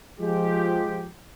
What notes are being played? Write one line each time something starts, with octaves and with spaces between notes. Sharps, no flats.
F3 G#3 G4